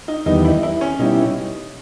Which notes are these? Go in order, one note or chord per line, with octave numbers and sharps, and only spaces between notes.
D#4
E2 D#3 G3 B3 D#4
E4
E4
C#4
B2 G3 C#4 D#4 E4